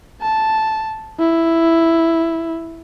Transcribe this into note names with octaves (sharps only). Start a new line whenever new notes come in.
A5
E4